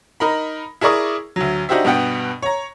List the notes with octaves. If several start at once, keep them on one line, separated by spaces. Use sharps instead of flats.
D#4 A#4 B5
E4 G#4 A#4 D5 C#6 D#6
D2 F#3
D4 D#4 F#4 G4 C5 E5
G2 B2 B3 F#5 G5
C#5 A#5